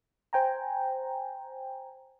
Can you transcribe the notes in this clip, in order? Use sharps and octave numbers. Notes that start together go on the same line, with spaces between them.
C5 G5 G#5 A#5